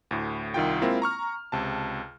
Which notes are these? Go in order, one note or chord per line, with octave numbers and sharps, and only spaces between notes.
D2 A2
C2 D#3 F4 G5
G#3 A#3 C4 E4 F4 A#4
A#5 C#6 F6
C#2 C3 A5